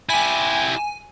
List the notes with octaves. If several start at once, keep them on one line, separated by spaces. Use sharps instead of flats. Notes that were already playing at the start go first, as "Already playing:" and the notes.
E4 G4 G#5